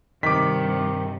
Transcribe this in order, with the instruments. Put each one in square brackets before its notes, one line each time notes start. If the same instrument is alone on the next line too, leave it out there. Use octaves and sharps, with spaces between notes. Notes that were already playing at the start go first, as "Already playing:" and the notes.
[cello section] G2 C3 [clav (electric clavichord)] D#3 [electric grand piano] D6 B6